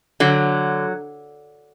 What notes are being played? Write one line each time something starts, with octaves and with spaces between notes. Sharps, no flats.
D3 F#3